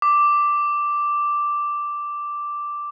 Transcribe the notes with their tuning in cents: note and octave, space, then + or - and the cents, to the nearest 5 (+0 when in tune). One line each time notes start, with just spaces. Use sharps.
D6 +0